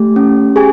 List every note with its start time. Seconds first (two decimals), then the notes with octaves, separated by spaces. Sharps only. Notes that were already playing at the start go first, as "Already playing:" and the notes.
Already playing: A3 G4
0.16 C#4
0.56 G4 G#4 G#5